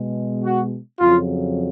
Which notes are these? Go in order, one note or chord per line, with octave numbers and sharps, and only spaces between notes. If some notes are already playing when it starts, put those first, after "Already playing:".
Already playing: B2 G#3
F#4
F2 C#3 F#3 F4